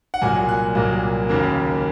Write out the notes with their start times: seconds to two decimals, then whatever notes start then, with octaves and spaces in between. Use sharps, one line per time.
0.14 F#5
0.22 C2 A#2 F#3 A#3 G#5
0.49 F#6
0.75 C2 A#2 F#3 A#3
1.29 D#2 C#3 F#3 A#3